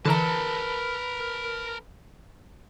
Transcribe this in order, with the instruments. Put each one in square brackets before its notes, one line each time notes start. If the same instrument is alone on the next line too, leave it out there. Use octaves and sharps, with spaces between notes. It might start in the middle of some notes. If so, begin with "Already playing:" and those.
[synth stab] D3 E3 A#5 [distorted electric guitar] A#4 A5 [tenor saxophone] B4